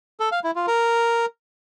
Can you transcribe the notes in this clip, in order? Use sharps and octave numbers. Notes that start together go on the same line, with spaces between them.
A4
F5
E4
F4
A#4